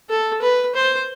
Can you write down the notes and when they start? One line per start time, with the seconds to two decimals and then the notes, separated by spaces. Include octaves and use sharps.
0.10 A4
0.42 B4
0.75 C5